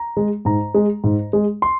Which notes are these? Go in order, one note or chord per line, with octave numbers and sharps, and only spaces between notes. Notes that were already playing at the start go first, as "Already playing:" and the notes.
Already playing: A#5
G#3
G#2 A#5
G#3
G#2
G#3
C6